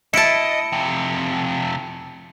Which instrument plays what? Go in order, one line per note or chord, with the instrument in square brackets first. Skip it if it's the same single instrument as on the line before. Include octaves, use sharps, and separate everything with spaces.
[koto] E4 A5 [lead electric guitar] D#5 [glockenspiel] C#7 D7
[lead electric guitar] F2 C3